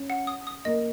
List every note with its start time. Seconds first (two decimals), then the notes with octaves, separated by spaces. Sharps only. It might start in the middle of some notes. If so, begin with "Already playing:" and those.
Already playing: C#4
0.10 F#5
0.27 D#6
0.47 D#6
0.65 A#3 D#5